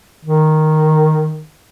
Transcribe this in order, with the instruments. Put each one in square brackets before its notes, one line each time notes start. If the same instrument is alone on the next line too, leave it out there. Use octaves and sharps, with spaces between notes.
[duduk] D#3